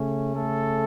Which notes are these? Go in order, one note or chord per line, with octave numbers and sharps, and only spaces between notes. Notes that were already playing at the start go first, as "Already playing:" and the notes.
Already playing: C#3 A3 C#4
A3 A4